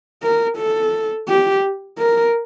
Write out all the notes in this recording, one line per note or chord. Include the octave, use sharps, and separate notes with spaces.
A#4
A4
G4
A#4